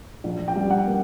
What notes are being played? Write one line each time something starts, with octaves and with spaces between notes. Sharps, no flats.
A#1
G5
G3
F#5
A#3